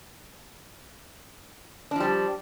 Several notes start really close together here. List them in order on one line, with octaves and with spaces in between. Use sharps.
D4 F3 G3